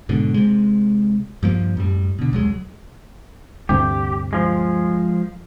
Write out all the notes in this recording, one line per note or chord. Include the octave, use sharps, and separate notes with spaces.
G#2 B2 D3
C3 G#3
G2 F3 A#3
F#2 A2 G3
B2 D3
D#1 C2 F#3 G#3
D2 G2 C3 G4
F3 G#3